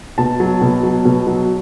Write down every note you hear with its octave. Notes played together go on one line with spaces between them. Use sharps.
B2 A5
F#3
B2
F#3
B2
F#3